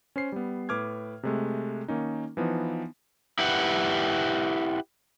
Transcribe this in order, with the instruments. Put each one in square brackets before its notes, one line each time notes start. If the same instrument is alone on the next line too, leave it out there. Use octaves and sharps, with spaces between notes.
[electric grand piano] C#4 C5 C7
G3 B3
A2 B4 D6 F6 G#6
C3 G#3 A3
D#3 A#3 C#4 D#4
E3 F3 B3 D#4
[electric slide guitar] E4 G4 B4 F#5